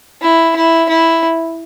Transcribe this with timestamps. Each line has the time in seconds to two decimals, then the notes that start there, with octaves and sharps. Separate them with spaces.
0.22 E4
0.56 E4
0.89 E4